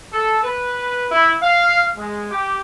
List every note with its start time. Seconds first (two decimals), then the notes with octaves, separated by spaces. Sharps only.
0.13 A4
0.44 B4
1.11 E4
1.42 F5
1.96 G#3
2.31 G4